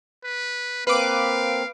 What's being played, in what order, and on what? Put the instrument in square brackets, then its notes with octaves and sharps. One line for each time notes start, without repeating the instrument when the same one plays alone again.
[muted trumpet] B4
[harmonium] A#3 C4 [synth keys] B4 D6 [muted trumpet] F5